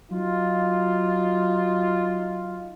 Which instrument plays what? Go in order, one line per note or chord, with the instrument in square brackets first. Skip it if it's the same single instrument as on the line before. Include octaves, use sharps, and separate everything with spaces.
[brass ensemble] F#3 D#4 F4